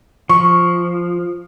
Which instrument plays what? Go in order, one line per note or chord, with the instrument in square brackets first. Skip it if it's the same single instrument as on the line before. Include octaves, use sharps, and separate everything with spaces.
[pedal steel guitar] F3 [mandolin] C#6